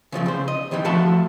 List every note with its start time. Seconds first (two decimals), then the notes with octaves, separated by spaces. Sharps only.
0.12 C#3 F3 A3 C4
0.26 C#3 C5
0.48 D#5
0.71 D#3 E3 C4 G4
0.85 F3 A3 F#4 E5 A5 B5